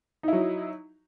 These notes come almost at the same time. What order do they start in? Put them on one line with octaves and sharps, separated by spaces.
D#4 E4 F#3